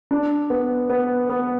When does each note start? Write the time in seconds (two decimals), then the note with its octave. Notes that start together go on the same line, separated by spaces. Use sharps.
0.11 D4
0.50 B3
0.90 B3
1.30 B3